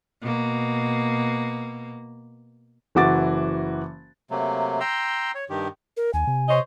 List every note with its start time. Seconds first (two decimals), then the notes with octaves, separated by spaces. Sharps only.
0.22 B2 A#3
2.95 F#1 E3 F#4 D6 A6
4.31 C3 F#3 A3 A#3
4.80 G5 A#5 C6 E6
5.35 C#5
5.50 G2 D#3 G4
5.97 A#4
6.14 D#2 G#5
6.27 C3
6.49 C5 C#5 D#5